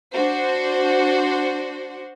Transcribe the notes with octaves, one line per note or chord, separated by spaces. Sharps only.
D4 F#4 C5